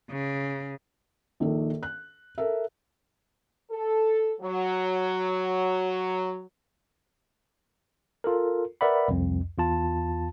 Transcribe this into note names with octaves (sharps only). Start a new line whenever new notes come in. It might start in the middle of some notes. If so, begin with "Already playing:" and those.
C#3
A#1 D#3 A4
F#6
A4 A#4 E5
A4
F#3
F4 A4 A#4
A#4 B4 D5 E5 F#5 B5
C2 F2
E2 F4 A5